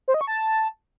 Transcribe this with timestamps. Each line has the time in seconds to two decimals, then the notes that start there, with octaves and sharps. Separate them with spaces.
0.08 C5
0.14 D#5
0.21 C#6
0.27 A5